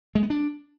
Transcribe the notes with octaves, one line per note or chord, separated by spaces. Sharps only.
G#3
B3
D4